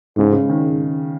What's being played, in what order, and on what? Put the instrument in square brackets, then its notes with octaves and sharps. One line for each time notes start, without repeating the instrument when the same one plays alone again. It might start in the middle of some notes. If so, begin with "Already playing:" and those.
[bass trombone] G#2 [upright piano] C#3
[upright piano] C#3
D#3